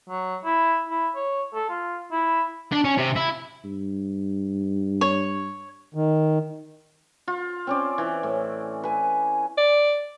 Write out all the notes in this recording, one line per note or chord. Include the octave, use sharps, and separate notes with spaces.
F#3
E4
E4
C#5
A4
F4
E4
D4
C#4
C3
E4
G2
C#5
D#3
F4
C4 C#4 D5
E3
A2
B4 G#5
D5